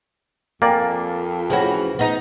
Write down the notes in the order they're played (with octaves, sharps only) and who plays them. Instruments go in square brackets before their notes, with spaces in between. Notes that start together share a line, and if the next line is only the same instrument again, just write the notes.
[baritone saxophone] F2 [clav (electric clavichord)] A#3 D5 [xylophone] G5 G#5
[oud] E3 C#4 F#4 [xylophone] G#4 C5 B5
[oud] B3 D#4